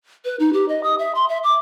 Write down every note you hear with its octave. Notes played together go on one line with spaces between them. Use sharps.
B4
D#4
G4
D#5
D#6
E5
C6
E5
D6